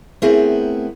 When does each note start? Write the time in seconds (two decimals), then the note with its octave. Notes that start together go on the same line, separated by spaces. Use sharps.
0.22 A3 B3 C4 E4 G#4 A#4